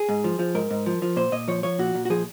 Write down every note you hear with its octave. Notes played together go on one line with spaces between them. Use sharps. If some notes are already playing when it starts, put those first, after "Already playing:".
Already playing: G#4
G#2
F3
F3
G#2 A#4
G#2
F3
F3
A#2 C5
A#2 D#5
F3 C#5
F3 C#5
A#2 F#4
A#2
F#4
F3 G#4